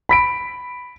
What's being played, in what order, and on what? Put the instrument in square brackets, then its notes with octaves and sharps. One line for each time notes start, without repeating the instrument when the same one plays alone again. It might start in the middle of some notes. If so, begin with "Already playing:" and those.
[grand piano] B5 B6 D7